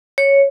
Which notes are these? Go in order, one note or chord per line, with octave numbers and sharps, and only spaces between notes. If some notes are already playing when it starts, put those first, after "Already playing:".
C#5